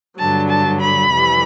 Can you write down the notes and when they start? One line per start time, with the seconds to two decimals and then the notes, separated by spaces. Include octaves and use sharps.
0.18 G2 D3 F#3 A5
0.50 A5
0.80 B5
1.11 F2 C3 E3 G3